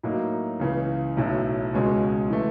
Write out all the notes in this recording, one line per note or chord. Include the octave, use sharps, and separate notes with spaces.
A2 F#3 A#3 D#4
C#2 C#3 E3
B1 A2 F#3
C#2 B2 G#3 C#4
E3 A3